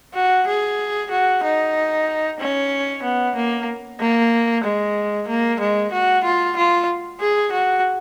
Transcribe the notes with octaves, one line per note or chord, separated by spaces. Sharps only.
F#4
G#4
F#4
D#4
C#4
B3
A#3
A#3
G#3
A#3
G#3
F#4
F4
F4
G#4
F#4